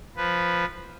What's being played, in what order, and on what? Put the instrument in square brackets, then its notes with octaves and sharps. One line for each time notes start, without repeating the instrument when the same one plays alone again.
[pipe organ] F3 B4